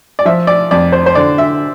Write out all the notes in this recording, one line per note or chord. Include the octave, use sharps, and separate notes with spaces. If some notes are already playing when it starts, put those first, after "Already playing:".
D5
F3 E5
D5
F2 D5
C5
C5
D3 D5
E5